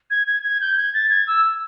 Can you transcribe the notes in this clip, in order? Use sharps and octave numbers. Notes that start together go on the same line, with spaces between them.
G#6
G#6
G#6
G6
G#6
A6
G#6
E6